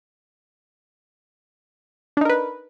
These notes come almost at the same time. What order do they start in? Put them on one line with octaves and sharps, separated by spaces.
D4 D#4 A#4 B4